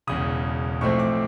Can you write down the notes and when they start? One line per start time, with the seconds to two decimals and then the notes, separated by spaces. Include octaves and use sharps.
0.07 E1 E2 C#3 D#6
0.81 B1 A2 F3 A3 C4 C#6
0.99 D6